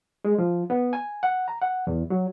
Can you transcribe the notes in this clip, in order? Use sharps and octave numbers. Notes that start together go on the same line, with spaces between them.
G#3
F3
B3
G#5
F#5
A#5
F#5
E2
F#3